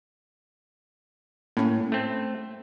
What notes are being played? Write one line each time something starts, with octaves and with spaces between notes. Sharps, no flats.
A2 A#3 C#4
A3 C4